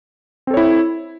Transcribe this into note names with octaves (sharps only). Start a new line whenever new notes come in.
C4 E4 A4 C#5